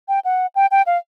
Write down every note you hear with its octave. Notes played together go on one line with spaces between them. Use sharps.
G5
F#5
G5
G5
F5